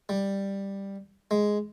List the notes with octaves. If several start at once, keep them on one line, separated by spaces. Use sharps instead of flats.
G3
G#3